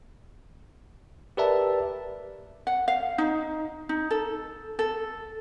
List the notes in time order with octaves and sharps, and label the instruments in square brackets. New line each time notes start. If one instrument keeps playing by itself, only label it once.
[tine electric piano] G4 A#4 B4 D5 E5 A5
[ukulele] F#5
F5
D#4
D#4
A4
A4